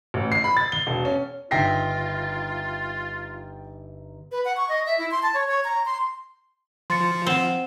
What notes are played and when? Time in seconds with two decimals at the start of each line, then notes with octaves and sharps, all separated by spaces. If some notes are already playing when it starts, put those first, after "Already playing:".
0.14 A1
0.32 C7
0.44 B5
0.57 A6
0.72 G7
0.87 E1
1.05 C#4
1.51 G1 D#4 F4 E5 G5 A#6 C7
4.32 B4
4.45 F#5
4.57 C#6
4.69 D#5
4.86 E5
4.98 E4
5.11 C6
5.23 A5
5.34 C#5
5.48 C#5
5.64 A#5
5.86 C6
6.90 F3 C6 A6 C#7
7.27 C4 F#5 E7 G7